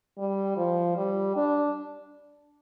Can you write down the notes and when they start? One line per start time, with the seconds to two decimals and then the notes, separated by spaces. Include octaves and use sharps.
0.18 G3
0.57 F3
0.96 G3
1.36 D4